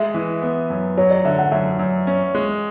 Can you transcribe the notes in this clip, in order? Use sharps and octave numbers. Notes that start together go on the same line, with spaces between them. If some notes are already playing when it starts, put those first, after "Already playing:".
Already playing: G#3 E5
E3
B3
F#2
F#3 C#5
D5
D3 E5
F#5
F#2 E5
F#2
C#4
G#3